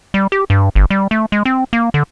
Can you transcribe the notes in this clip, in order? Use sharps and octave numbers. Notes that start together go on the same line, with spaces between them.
G3
G4
G2
G1
G3
A3
G#3
C4
A#3
D3